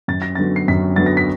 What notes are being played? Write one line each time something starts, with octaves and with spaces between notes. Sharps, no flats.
F#2 A6
A#6
D3 F#3 B3 A6
C7
F#2 B6
D3 F#3 B3 A6
A#6
B6